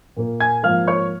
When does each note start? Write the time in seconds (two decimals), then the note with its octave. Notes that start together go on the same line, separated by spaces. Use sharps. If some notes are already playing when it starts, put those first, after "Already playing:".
0.17 A#2 A#3
0.40 G#5 G#6
0.63 G#2 F3 A#3 F5 F6
0.88 C#5 C#6